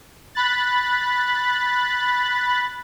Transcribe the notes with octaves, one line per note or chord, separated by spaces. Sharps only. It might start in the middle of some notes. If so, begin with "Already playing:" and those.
B5 F#6 A6